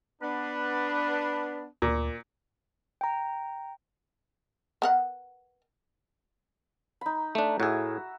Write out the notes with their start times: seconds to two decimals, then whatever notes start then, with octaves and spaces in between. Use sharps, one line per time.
0.22 B3 D4 B4
1.82 D2 A#2
3.01 G5 A#5
4.82 B3 A#4 F#5
7.01 D#4 B5
7.35 A3 D4
7.60 A2 F#4 G#4 E5